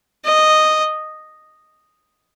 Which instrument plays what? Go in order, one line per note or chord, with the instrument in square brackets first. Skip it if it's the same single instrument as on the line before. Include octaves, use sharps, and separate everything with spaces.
[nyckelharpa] D#5